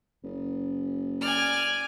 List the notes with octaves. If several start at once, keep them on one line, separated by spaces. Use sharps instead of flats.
F#1
D5 G#5 F6